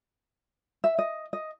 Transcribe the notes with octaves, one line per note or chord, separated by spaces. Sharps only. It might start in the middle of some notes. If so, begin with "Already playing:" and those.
E5
D#5
D#5